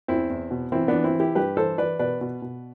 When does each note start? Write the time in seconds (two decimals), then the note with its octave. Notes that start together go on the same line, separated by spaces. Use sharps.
0.08 E2 C4 E4
0.30 E2
0.51 B2
0.72 E3 C4 E4
0.88 B3 D4
0.94 E3
1.04 C4 E4
1.15 E3 E4 G4
1.35 G2 G4 B4
1.57 E3 A4 C5
1.78 E3 B4 D5
1.99 B2 B4 D5
2.21 B2
2.42 B2